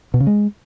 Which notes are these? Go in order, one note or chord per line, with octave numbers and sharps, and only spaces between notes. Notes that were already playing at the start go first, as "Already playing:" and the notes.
B2
C#3
G#3